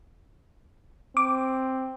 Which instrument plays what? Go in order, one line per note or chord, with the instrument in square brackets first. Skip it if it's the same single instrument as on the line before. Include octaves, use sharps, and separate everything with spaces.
[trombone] C4 [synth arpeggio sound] D6